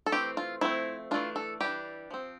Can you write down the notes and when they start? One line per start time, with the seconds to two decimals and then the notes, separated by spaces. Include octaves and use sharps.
0.06 A4
0.12 E3 A3 C4 G4
0.37 F4
0.61 F3 A3 C4 E4
1.11 E3 A3 D4 F4
1.36 A4
1.61 E3 G3 D4 G4
2.11 F3 C4